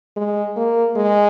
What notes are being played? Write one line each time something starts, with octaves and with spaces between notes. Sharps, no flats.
G#3
A#3
G#3